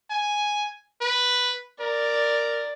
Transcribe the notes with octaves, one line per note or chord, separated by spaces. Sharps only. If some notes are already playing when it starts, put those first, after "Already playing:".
G#5
B4
A#4 D5